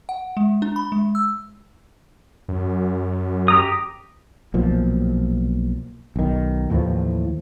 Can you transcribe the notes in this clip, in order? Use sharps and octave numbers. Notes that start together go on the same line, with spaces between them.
F#5
G#3
D4
B5
G#3
E6
F#2
G4 A#5 D#6
B1 A#2 F3
B1 D#3
D#2 A2 E3 F3